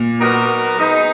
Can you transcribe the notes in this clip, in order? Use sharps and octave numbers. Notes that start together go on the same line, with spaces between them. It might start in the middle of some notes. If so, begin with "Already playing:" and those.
Already playing: A#2
F#3 B3 D#4 F#4 A#4
G#3 B3 D#4